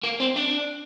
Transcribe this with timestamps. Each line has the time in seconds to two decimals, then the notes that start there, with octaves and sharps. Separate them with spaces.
0.03 A#3
0.20 C4
0.36 D4